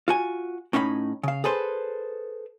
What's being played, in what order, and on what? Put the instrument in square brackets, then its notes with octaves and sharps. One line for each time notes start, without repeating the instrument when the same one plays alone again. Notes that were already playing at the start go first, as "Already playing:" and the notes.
[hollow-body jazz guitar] F4 F#4 G#5
A2 C#4 D#4 E5 B5
C#3 F5
G#4 A4 B4 C5